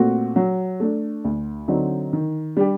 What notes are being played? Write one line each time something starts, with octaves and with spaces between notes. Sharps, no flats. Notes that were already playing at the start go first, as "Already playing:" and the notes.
Already playing: A#2 A3 C4 F#4
F#3
A3 D4
D2
D3 F#3 C4 D#4
D#3
G3 D4 G4